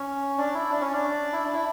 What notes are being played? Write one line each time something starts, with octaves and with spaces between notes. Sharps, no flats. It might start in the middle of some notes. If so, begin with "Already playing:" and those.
Already playing: C#4
D4
E4
D4
C#4
D4
E4
D4
E4